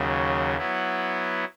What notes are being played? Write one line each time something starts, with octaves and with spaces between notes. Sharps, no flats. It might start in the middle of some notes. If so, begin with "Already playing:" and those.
Already playing: D#2 C#3 F#3
F#3 B3 E4